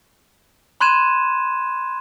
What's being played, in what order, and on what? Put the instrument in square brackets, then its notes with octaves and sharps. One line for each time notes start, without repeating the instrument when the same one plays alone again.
[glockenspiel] B5 C6 F#6 G#6 D#7 E7